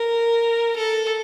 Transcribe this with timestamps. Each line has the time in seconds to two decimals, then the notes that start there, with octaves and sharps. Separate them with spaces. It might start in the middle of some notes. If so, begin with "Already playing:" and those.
Already playing: A#4
0.76 A4